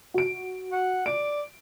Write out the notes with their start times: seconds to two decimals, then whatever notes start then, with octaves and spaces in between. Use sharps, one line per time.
0.14 F#4 D7
0.72 F#5
1.06 D5 D7